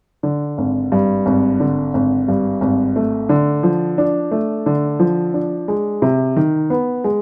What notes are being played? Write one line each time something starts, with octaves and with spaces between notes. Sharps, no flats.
D3
G#1
G2
G#1
D3
G#1
G2
G#1
A3
D3
F3
D4
A3
D3
F3
D4
G#3
C3
D#3
B3
G#3